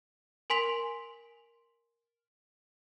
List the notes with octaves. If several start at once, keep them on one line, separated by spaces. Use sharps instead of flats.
A#4 G#5 C6 B6 F7 F#7